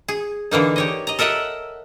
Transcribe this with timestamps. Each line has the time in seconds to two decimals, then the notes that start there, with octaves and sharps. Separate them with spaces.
0.08 G#4
0.51 D3 E3 A#3 D#4
0.76 G4 C#5 D#5
1.07 D#5 A#5
1.19 A4 A#4 D#5 E5 F#5